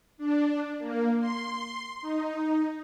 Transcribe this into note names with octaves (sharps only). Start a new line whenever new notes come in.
D4
A#3
C6
D#4